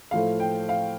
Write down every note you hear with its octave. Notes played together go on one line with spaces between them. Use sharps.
A2 F3 A3 F5
G5
F5